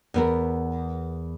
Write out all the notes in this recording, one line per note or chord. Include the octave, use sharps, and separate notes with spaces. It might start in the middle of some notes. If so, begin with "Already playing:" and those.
E2 B3 A#4